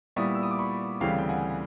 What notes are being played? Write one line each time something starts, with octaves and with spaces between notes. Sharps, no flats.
A#2 G3 B3 E4 C#6 D#6
E6
D#6
D6
B5 C#6
D2 C#3 E3 G3 C4 F5 G5
G5
F#5 G#5